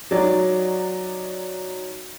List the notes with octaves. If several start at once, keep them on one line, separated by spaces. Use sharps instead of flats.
F#3 D#4 D5